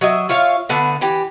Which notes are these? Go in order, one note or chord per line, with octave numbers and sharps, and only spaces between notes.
F#3 D#5 E5
F4 C#5 E5 F5
D3 A3 B3 A5
E3 G4